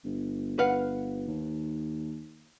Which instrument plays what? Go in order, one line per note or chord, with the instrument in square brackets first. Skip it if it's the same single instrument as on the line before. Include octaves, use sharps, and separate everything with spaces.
[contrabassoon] G1
[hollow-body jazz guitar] B4 F5 F#5
[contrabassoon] D#2